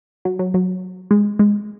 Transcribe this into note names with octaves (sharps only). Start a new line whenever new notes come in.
F#3
F#3
F#3
G#3
G#3